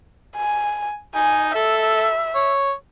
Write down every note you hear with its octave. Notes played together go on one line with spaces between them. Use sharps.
G#5
D#4 G#5
A4 E5
C#5